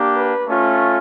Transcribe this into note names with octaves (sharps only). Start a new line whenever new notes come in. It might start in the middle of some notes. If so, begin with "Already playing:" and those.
Already playing: A#3 D4 G4
B4
A3 C#4 F4